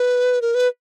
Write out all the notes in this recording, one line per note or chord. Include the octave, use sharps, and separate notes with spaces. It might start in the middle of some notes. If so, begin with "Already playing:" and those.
Already playing: B4
A#4
B4